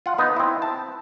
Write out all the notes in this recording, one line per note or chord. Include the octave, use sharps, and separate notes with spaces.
F4 F#5
B3 D#4
C4 E4
A5